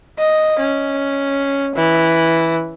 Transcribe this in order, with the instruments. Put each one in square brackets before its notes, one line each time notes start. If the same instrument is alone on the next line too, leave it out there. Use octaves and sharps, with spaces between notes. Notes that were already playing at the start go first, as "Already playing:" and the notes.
[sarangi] D#5
C#4
E3